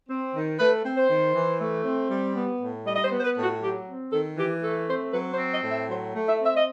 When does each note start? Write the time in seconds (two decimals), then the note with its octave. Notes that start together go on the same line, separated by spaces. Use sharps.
0.08 C4
0.32 D#3
0.58 A3 B4
0.83 C4
0.96 C5
1.08 D#3
1.34 E3
1.59 A3
1.84 C4
2.09 G3
2.34 B3
2.59 A2
2.85 G3 D#5
2.96 D#5
3.04 C5
3.10 B3
3.18 C5
3.23 B4
3.35 A2
3.42 F#4
3.60 F#3 G4
3.87 C4
4.11 D#3 A4
4.36 E3 G4
4.62 A3 A4
4.87 C4 C5
5.12 F#3 B4
5.32 C5
5.37 C4
5.50 D#5
5.62 A2
5.69 E5
5.88 F#3 C5
6.13 A3
6.27 E5
6.39 C4
6.45 E5
6.54 D#5